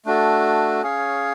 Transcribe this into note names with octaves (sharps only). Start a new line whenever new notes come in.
A3 D4 F#4 A4
C#4 G#4 C#5 F5